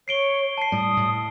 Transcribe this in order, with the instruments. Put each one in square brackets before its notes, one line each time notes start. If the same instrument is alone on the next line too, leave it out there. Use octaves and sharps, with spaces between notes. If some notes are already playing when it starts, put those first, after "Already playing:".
[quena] C#5 [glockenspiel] C7 D7 G7
[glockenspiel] A5 C7
[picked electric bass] A2 G3 [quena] D#6
[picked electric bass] A2